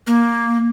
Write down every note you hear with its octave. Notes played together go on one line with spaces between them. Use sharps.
A#3